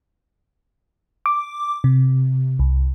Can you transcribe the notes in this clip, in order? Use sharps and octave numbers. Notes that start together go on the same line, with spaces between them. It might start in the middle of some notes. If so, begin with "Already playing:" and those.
D6
C3
C2